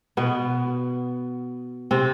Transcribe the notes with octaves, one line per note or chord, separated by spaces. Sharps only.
B2 B3
C3 C4